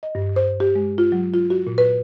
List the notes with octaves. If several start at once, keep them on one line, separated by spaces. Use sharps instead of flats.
D#5
G2
C5
G4
G#3
F4
F#3
F4
F#4
A#2
B4